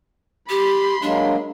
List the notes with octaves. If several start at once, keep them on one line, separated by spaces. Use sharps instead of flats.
G4 B5 C6
F#3 G#3 A#3 D4